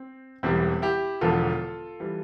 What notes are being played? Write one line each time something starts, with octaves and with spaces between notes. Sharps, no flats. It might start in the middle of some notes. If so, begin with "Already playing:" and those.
Already playing: C4
E1 E2 E3 G3 C4 E4
E4 G4
E1 E2 D3 F3 F4 A4
E3 G3